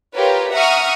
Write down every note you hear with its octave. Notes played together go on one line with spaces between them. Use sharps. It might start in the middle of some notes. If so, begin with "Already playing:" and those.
F4 G4 A#4 B4 C#5
E5 F#5 A#5 C#6 D#6 F6